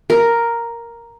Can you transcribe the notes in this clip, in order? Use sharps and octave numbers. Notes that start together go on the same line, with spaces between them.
A#4